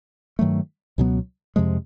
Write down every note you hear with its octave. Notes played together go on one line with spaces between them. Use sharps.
G2 D#3 F#3 A3
C#2 B2 F#3 B3
F2 C3 F3 G#3